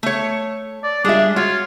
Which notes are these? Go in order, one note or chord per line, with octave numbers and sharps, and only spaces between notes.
A3 C#5
D5
G3 G#3 D4 F4 G#4 E5
F4 F#4 C#5